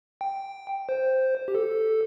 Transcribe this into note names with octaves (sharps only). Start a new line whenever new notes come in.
G5
C5
G4
A4